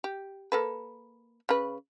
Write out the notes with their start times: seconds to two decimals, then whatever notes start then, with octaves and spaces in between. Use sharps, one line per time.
0.04 G4
0.52 A#3 A4 B4
1.49 C#3 B4